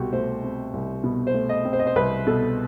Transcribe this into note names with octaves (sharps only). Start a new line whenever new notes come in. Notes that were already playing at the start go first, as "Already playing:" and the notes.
Already playing: C2 B2 F#4 G4
A3 C5
C4
C2
B2
C5
A3
D#5
C4
C5
D#5
C5
C2 B4
B2 A4